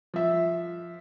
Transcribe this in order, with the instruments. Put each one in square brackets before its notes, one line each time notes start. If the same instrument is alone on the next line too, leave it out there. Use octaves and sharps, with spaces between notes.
[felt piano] F3 E5